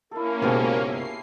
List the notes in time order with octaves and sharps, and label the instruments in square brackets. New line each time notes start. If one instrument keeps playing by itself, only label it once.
[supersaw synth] A#3 C#4 [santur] E4 A4 [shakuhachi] A#4
[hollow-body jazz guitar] C#2 G#2 B2 [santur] G#3 G4 A5
[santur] E5 [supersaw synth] C7